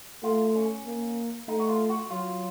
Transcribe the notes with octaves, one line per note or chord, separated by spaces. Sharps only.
A3 F4
C#4
A#3
A3 D#4
F#4
F4
F#4
F#3 F4